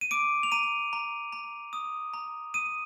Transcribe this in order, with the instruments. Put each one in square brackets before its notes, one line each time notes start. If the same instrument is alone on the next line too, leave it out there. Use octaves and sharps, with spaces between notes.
[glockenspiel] D#7
D6 D7
F7
A#5 D#7
A#5
A#5
D#6
A#5
D#6 D#7